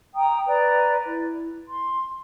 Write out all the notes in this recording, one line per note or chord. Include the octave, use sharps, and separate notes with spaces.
G5 A#5 D#6
B4 D5 A#5
E4
C6